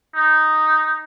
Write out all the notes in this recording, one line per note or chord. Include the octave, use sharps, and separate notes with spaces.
D#4